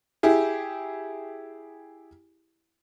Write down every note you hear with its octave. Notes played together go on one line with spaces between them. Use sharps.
E4 G4 G#4